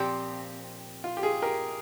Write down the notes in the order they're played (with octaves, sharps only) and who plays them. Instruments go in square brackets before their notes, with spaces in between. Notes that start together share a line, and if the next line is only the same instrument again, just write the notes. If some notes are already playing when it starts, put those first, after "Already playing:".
Already playing: [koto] A#2 F3 C4 [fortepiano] G4
[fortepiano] F4
G4
F4 G#4
G4 A#4